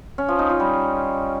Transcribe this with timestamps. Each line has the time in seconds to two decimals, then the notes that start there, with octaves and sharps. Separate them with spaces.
0.18 C#4
0.29 F3
0.39 D#4
0.49 F4
0.60 G3